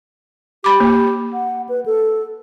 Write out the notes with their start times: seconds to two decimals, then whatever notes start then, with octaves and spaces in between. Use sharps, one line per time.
0.64 G4 B5 D6
0.80 A#3
1.33 F#5
1.69 B4
1.86 A4